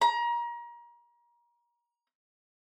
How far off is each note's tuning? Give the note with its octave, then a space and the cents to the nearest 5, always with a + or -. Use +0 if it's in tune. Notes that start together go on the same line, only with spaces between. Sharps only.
A#5 +30